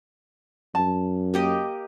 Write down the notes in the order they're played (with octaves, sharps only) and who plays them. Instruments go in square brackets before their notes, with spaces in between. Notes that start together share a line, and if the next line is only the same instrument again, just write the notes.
[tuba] F#2 [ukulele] A5
[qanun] A#3 G4 D#5